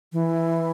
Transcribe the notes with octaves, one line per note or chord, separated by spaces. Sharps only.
E3